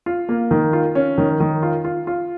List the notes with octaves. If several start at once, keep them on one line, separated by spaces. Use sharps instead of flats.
F4
A#3
D#3
F4
C#4
D#3
D#3
F4
F4
F4